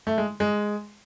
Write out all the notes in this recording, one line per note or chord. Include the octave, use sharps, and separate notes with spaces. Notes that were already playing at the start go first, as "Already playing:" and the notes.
A3
G#3
G#3